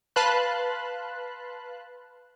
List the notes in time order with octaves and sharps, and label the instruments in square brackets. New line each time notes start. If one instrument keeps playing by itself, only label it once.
[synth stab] B4 F5 A5 B5 C6 F#6